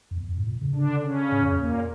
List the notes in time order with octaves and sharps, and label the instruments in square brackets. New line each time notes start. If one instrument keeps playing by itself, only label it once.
[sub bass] F2
E2
F2
A2
A#2
C#3
[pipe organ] D3 D4
C#3 C#4
[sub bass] A2
F2
E2
[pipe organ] A#2 A#3